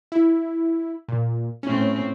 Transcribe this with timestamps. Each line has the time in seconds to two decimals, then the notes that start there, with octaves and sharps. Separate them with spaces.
0.12 E4
1.09 A#2
1.63 A2 C4 C#4